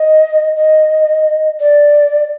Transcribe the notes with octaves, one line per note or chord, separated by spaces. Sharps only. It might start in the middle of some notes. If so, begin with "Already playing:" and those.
Already playing: D#5
D#5
D5